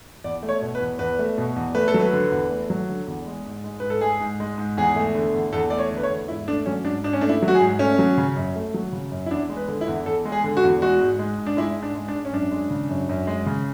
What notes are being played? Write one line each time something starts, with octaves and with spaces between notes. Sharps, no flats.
E2 D5
A3
C#5
B2
B4
E2
E2 B4
A3
B2
E2
A3 B4
A4
F#3
B4
D3
E2
A3
F#3
D3
E2
G#3
G#2
G#3
G#2 B4
A4
G#3 G#4
G#2
G#3
G#2
E2 G#4
A3
D3
E2
E2 A4
A3 D5
C#5
D3
B4
C#5
E2
G#2 E4
A3 D4
F#3 C#4
G#2 D4
G#2 D4
C#4
A3 D4
E4
F#3
F#4
G#4
G#2
A3 C#4
F#3
C#3
F#2
A3
F#3
C#3
F#2
E4
E2 D4
G#3
B4
D3
E4
E2
E2 A4
G#3
G#4
D3
F#4
E2
G#3 F#4
G#2
G#3
G#2
D4
G#3 E4
G#2
D4
G#3
D4
G#2
C#4
F#2 D4
G#3
C#3
F#2
F#2
G#3
C#3